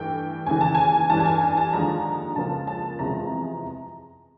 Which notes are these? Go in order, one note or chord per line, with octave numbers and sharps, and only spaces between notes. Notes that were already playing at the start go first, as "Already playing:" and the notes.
Already playing: G2 E3 A3 G5
D#2 C#3 E3 G#5
A5
G#5
G2 E3 G3 A5
A5
G#5
G#5
A5
D#2 D3 F3 G#3 A#5
C#2 C#3 F3 A#3 A5
A5
E2 C3 F3 G#3 A#5